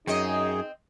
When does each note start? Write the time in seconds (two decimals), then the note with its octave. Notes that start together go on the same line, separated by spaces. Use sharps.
0.07 F#2 C4 D#4 G#4 D#5